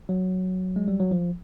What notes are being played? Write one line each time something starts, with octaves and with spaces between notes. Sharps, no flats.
F#3
G#3
G3
F#3
F3